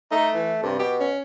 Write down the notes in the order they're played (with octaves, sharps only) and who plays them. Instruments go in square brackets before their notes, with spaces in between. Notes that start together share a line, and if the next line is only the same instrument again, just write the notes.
[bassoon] A3 [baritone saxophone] D#4
[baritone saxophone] E3
[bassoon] G2 [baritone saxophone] C3
[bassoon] B2 [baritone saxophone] G4
[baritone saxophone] C#4